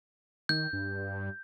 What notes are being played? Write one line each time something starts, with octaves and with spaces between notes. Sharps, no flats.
D#3 G6
G2